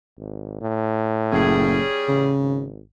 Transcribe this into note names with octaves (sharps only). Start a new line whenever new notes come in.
G#1
A2
F#1 G3 C#4 G#4
A1 C#3
G#1